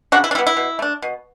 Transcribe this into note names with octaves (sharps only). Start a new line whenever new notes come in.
C#3 D4 F#4
E4
D4
G3 B3 E4
E4
B2
A3 D4
B2